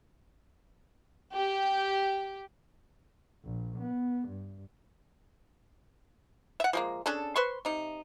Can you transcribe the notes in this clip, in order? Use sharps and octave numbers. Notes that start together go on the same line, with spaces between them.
G4
A#1
B3
G2
E5 F#5
F3 G#3 A#3
C#4 D4 G#4 A4
B4 C5 C6 C#6
C3 D#4